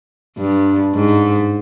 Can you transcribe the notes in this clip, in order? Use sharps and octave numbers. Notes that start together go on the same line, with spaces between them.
G2
G#2